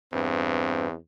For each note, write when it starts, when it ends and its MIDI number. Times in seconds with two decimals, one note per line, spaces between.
0.13 0.95 40
0.13 0.88 43
0.13 0.96 60